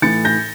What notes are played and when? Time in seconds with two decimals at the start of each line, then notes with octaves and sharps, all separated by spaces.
0.02 A2 E3 A6 C#7
0.25 G6 A#6